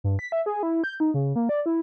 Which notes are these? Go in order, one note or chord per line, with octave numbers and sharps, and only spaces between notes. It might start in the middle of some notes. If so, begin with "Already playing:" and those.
G2
B6
E5
G#4
E4
G6
D#4
C#3
A#3
D5
E4